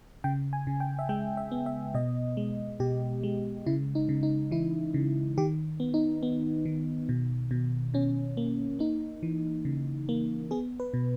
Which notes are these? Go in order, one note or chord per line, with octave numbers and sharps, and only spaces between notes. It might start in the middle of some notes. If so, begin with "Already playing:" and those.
C#3 G5
G#5
C#3
G5
E5
G#3 G5
E5
B3
E5
B2 D#5
G#3
B2 G4
G#3
C#3 E4
D#4
C#3
D#4
E3 E4
C#3
D#3 G4
B3
D#4
B3
D#3
B2
B2
B2 C#4
A#3
A#3 D#4
E3
C#3
A#3
B3 G#4
B4
B2